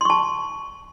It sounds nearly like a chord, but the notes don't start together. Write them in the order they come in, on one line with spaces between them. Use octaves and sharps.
C6 C#6 A5